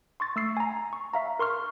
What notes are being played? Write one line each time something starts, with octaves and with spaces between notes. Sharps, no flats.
C6 C#6 A6
A3 E6 C7
G#5 A#5
C#6
E5 F5 A#5
A#4 C6 C#6 F6